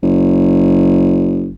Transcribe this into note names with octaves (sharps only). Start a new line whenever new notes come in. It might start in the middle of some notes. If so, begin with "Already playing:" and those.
F#1